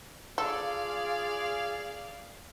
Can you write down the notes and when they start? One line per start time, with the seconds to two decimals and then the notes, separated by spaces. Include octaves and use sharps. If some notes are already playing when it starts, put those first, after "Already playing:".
0.38 F4 G#4 A4 D5 F5